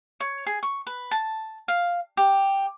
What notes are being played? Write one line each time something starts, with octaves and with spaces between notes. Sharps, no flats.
C#5
G#4
C#6
B4
A5
F5
G4